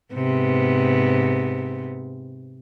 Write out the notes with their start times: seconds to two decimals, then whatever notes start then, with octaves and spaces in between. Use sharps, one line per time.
0.14 G#2 C3 B3